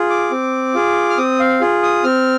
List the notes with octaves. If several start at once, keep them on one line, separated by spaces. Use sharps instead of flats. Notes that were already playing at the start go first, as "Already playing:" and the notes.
Already playing: F4 G#4
D6
C4
F4 G#4
F6
C4 D#6
F5
F4 G#4
D#6
C4 F6